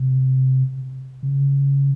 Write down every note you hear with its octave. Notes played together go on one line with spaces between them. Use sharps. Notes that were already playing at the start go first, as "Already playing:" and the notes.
Already playing: C3
C#3